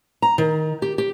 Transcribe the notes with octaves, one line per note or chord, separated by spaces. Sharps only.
A#5
D#3
G4
G4